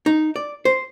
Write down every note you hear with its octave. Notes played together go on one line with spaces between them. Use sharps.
D#4
D5
C5